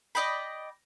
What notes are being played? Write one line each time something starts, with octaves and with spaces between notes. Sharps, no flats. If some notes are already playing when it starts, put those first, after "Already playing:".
D5 D#5 G5 B5